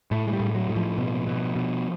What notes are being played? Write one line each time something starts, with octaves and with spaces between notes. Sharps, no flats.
A2 A3
G#3
G3
A2
F#3
A2
F3
B2
B2
B2